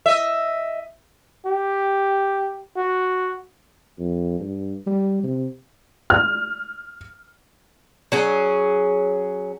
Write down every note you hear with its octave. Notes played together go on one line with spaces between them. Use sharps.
D#5 E5
G4
F#4
F2
G2
G3
C3
F6
F#3 C#4 G#4